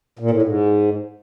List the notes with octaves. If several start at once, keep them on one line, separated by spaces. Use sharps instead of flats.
A#2
A2
G#2